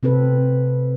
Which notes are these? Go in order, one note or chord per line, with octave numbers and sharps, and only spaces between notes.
C3 C4 A4 B4